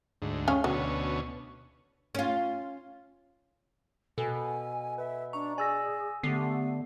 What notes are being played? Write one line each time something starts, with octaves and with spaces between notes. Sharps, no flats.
D2 G#2
C#4 C#5 F5
D2 B2 F#3 C#4
C#4 F4
B2 A4 G#5
B4 E5
D4 A#5 C#6
G#4 D5 G#5 E6 A#6
D3 A3 B3 G4 C7